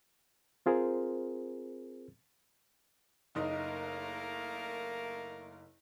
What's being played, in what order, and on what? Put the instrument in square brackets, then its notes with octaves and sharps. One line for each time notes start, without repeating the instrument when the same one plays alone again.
[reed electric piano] C4 F4 G#4 A#4 C5
[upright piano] F#1 D#4 D#5 [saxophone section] A3 A#3 A#4